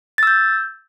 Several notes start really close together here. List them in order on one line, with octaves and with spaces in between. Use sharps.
A6 E6 G6